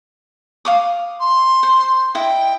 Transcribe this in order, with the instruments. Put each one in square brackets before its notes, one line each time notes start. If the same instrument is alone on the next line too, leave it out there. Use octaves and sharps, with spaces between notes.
[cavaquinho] F5 D6 D#6
[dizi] C6
[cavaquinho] C5
[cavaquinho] E4 D#5 [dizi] G5